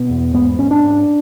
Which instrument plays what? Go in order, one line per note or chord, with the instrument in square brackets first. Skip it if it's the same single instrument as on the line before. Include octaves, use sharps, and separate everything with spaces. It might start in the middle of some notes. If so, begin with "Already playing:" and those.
Already playing: [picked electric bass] B2 B3
E2
G#2 B3
G#2 C#4
D4
G#2